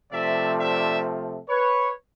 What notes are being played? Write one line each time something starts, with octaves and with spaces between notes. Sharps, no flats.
C3 F3 A3 D5 E5
D5 E5
B4 C#5